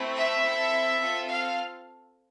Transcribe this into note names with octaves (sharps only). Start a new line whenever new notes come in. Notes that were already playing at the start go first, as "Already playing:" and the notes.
Already playing: A3 C4 E4
E5
C4 E4 A4
C4 F4 A4
F5